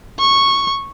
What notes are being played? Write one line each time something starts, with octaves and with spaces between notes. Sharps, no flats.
C#6